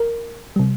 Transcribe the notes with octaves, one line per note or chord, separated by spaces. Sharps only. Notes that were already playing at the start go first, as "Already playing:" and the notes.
Already playing: A#4
C3 G3